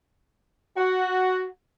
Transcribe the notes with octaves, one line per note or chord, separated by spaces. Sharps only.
F#4